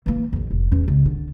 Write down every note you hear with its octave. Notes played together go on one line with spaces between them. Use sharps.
E3 A#3
A1 F2
F1
E2 C#4
C#2
D3